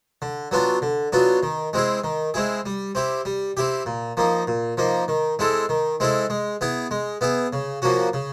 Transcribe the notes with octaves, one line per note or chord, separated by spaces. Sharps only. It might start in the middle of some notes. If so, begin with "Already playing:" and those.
D3
F#3 B3 D4 F4
D3
F#3 B3 D4 F4
D#3
G#3 C4 E4 G#4
D#3
G#3 C4 E4 G#4
G3
C4 E4 G4
G3
C4 E4 G4
A#2
F3 A#3 D#4
A#2
F3 A#3 D#4
D#3
G#3 C4 E4 A4
D#3
G#3 C4 E4 A4
G#3
B3 E4 G#4
G#3
B3 E4 G#4
C#3
F3 A#3 C#4 F#4
C#3